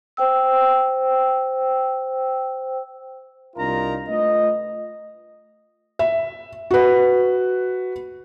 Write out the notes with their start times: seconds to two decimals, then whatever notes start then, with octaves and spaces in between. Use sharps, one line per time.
0.17 C5 G5 E6
3.56 C2 D4 D#4 F4 A#4 A#5
4.09 A3 F4 B4 D#5
5.99 E5
6.71 F#4 B4